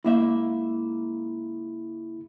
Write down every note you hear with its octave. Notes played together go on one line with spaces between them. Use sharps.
C#2 A#3 E4 E5